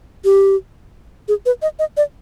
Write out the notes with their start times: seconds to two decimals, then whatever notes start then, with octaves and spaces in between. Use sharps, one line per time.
0.24 G4
1.28 G#4
1.46 B4
1.62 D#5
1.79 D#5
1.97 D5